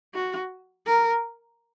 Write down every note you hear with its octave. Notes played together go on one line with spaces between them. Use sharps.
F#4
A#4